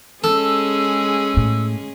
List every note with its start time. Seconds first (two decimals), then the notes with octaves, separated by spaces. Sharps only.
0.24 G#3 C#4 G#4 A4 E6
1.37 A2